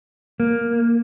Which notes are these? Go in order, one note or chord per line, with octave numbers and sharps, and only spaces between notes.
A#3